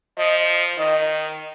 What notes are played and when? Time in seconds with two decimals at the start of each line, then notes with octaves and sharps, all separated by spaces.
0.18 F3 D#5
0.79 D#3 D#5